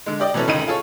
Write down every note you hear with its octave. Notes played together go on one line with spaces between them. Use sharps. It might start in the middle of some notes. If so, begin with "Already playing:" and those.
D3 G#3
G4 D5 D#5
B2 E3 F#3 C#4 A4
F1 C#2 D#3 D#5 B5 D#7
F4 G#4 A4 C#5